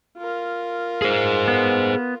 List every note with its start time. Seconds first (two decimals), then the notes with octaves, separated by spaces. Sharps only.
0.17 F4 A#4
1.02 G#4 C5
1.48 B3